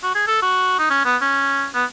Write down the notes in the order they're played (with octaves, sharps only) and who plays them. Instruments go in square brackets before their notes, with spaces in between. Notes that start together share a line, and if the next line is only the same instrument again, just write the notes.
[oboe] F#4
G#4
A4
F#4
D#4
C#4
B3
C#4
B3